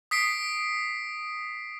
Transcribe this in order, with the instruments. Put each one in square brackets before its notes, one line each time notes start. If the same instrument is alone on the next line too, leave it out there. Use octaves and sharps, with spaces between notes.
[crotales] D#6 B6 C7 D7